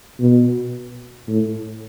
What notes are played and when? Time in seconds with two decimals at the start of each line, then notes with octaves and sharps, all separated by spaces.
0.20 B2
1.28 A2